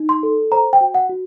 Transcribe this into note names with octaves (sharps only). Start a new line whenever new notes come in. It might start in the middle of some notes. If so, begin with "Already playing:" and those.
Already playing: D#4
C6
A4
C5 A#5
G5
F#4
F#5
F#4